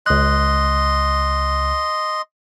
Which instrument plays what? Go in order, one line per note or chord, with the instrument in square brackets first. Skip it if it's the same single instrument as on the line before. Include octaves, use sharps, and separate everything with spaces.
[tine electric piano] C#2 F#6 [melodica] D#5 C6